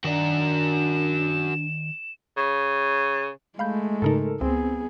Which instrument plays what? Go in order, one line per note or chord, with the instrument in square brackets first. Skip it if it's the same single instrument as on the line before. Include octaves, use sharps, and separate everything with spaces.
[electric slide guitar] D#3 D5 [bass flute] D4 [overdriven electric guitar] F#4 A#4 [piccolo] E7
[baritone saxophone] C#3
[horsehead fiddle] G#3 A3 [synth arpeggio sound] F5 B5 G6
[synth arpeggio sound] G#2 C#3 D#4 [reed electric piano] A4 A#4
[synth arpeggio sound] C#2 [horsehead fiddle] B3 G#4 [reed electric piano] C4